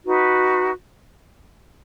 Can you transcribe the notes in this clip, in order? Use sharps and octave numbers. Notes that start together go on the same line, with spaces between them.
D#4 F#4 B4